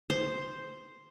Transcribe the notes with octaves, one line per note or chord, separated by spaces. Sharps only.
C5